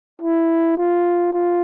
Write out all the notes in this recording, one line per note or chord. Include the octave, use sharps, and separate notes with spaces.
E4
F4
F4